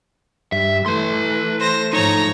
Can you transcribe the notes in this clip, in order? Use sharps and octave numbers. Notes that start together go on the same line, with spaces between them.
G2 E5
E3 A3 B4 C6
C5 A#6
G#2 F3 D#4 C#5 A#5